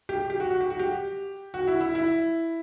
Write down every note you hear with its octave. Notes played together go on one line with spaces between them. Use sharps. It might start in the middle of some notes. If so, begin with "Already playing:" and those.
G4
G4
F#4
F#4
G4
F#4
G4
F#4
E4
E4
E4